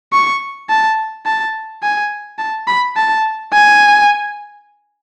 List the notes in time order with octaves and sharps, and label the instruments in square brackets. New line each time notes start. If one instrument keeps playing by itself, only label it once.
[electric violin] C#6
A5
A5
G#5
A5
B5
A5
G#5